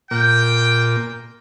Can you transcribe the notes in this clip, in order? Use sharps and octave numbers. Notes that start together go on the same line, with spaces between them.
A#2 G5